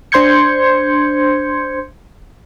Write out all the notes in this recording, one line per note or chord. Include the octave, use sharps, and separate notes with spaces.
D4 C5 C6 G6 G#6 C#7